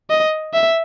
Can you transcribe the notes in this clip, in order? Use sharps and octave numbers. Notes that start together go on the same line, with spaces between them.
D#5
E5